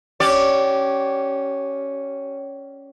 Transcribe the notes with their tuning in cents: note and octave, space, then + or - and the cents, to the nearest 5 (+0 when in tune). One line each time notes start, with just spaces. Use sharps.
C#4 +0 G4 -25 D5 +0